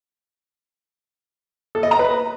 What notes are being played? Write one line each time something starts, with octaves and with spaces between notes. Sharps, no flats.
A4
D#5
A#5
B4